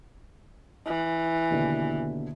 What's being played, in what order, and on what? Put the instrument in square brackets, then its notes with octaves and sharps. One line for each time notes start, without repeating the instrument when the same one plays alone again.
[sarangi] E3
[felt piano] D#2 B2 D3